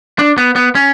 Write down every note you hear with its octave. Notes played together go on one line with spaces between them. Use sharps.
D4
B3
B3
C#4